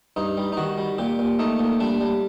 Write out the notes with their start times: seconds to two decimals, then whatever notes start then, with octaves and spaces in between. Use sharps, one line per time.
0.16 G2 D#4
0.37 G3
0.52 D#4
0.57 D#3 F#4
0.78 G3
0.98 A#2 G4
1.19 A#2
1.39 A3 D#4
1.59 A#2
1.80 G3 D4
2.01 G3